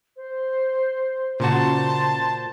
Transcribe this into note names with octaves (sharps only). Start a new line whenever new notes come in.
C5
A#2 C#3 F#4 C5 A5 C6